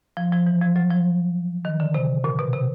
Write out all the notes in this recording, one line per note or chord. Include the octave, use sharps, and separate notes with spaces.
F3
F3
E3
F3
F#3
F3
D#3
D3
C3
A#2
B2
C3